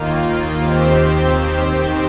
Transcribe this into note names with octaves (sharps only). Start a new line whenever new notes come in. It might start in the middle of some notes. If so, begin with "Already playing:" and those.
Already playing: D#2 D#3 A#3 F4
F4
D#2 D#3 C4 G4 C5